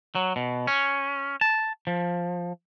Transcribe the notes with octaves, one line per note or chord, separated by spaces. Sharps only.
F#3
B2
C#4
A5
F3